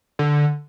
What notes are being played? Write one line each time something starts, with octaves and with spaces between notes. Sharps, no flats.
D3